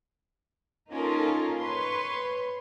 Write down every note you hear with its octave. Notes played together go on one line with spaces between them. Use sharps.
A#3 C#4 D#4 F4 A4 A#4
B4 C#5 C6